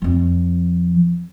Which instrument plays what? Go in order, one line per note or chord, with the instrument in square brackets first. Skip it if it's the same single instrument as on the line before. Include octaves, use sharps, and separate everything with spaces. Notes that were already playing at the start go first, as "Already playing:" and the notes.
[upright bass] F2 F3